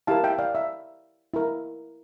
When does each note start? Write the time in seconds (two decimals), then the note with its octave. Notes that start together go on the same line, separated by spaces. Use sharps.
0.07 E4 G4 A#4 F5 A5
0.24 E5 G5
0.39 D5 F5
0.55 E5
1.34 E4 A#4